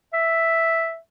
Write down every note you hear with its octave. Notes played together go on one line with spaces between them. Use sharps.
E5